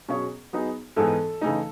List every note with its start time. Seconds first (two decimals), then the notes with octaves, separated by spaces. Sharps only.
0.09 B2 F#3 C#4 G#4 C#5
0.53 F#3 B3 D#4 G#4
0.96 G#2 E3 B3 D#4 A4
1.41 C#3 E3 A3 D#4